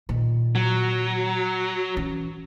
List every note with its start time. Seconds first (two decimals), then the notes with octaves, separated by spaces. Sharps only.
0.09 A#2 D#3
0.55 F#3
1.97 E3 C#4